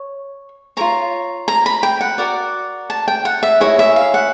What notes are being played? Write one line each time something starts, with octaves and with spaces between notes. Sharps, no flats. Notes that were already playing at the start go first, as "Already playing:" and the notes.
Already playing: C#5
F4 A#4 C#5 A#5
A#5
B5
G5
F#5
F#4 A#4 D5
A5
G5
F#5
E5
E4 G#4 C#5 D#5
E5
F5
F#5